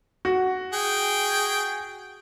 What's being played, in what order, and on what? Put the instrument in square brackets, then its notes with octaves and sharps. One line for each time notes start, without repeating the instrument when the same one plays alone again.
[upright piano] F#4
[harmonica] G#4 G5